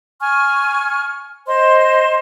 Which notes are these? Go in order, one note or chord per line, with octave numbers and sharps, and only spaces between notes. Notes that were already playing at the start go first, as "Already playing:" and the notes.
G#5 C#6 F6
C5 D#5 C6